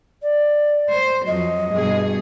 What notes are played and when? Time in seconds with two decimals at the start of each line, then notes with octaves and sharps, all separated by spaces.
0.22 D5
0.91 C5
1.27 F2 F#3 D#5
1.73 G2 B2 G#4